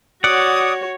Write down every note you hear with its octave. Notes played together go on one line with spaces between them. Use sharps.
F#4 C#5 D5 F#5 D#6